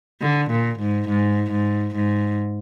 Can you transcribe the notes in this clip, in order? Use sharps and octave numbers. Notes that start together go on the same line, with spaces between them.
D3
A#2
G#2
G#2
G#2
G#2